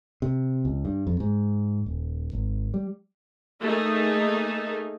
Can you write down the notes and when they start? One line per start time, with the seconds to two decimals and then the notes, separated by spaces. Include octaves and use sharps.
0.22 C3
0.65 C#2
0.85 G2
1.07 F2
1.20 G#2
1.86 D#1
2.33 G#1
2.74 G3
3.61 A3 A#3 D#4 G#4